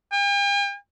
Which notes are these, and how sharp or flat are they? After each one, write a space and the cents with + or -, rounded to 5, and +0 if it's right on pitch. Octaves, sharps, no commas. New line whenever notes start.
G5 +45